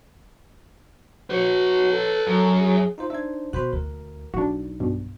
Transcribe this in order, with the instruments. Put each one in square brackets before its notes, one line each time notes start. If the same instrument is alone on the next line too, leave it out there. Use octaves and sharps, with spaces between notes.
[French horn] F#4 [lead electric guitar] B4 C#5
[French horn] A4
[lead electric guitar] F#2
[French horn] G#4
[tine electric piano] D#4 F4 C5
[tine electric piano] D4 D#4 C5 [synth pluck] E5 G#6
[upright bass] B2 [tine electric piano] F#4 C5 B5 [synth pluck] F#6
[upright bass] D2 [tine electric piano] A#4
[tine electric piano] B1 [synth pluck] D4 F#4 [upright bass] D#4
[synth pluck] G2 B2